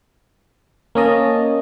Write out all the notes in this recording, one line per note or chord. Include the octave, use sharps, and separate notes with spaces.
A#3 C#4 D#5 A5